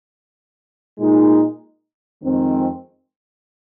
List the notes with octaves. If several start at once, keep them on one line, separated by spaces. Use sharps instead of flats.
A#2 G#3 D#4
F2 D#3 G#3 C4